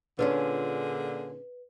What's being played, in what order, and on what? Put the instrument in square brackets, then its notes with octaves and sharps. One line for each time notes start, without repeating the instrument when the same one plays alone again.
[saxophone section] A#2 D3 G#4 [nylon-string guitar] C#4 D4 F4 [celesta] B4